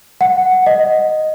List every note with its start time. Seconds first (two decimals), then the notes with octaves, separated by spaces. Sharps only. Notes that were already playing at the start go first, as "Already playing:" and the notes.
0.21 F#5
0.66 D#5